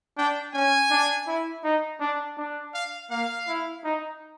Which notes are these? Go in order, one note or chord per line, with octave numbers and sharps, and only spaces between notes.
D4 G5
C#4 G#5
D4
E4
D#4
D4
D4
F5
A#3 F5
E4
D#4